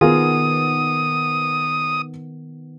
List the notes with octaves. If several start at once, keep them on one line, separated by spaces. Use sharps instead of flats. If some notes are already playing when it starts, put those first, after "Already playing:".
D#3 B3 F4 G#4 A#4 D#6